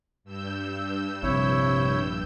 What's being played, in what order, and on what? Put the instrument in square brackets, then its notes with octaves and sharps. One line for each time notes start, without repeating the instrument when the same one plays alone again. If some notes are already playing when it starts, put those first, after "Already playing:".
[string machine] G2 E6 G6
[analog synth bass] A#1 [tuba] C3 [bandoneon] E4 C#5